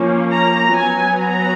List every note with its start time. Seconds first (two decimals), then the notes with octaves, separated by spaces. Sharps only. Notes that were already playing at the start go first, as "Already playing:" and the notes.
Already playing: F3 A#3 C#4
0.31 A#5
0.74 F#3 B3 G#5
1.18 A#5